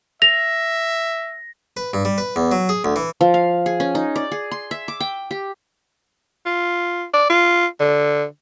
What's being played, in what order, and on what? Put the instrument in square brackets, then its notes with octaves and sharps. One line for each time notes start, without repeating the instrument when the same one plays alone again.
[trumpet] E5 [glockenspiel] A#6 [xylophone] F7
[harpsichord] B4
G2
G3
B4
E2
F#3
G#4
D2
E3
[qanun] F3
F5
G#4
C#4
D#4
D5
G#4
C6
E5
D6
G5
G4
[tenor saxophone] F4
D5
F4
D3